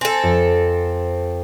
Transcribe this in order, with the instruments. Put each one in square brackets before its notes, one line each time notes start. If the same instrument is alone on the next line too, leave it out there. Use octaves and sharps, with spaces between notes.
[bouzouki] C4 A4 [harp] G#5 A5
[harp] F2